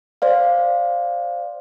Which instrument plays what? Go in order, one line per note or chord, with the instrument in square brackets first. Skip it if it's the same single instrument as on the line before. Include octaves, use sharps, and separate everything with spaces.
[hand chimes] C5 D5 F5